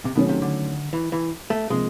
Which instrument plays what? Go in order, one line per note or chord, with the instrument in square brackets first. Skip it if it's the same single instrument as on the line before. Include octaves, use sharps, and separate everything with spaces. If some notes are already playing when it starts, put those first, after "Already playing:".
[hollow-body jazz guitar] C3
[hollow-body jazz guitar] B2 [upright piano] D#3 F#3 A3 C#4
[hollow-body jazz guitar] C3
D3
E3
E3
A3
[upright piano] C3 F3 A#3 [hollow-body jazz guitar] G#3